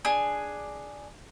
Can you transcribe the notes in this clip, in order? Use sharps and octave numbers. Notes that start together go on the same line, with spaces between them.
D4 G#4